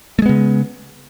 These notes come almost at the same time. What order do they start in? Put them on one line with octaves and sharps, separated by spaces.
A3 G#3 B3 C#3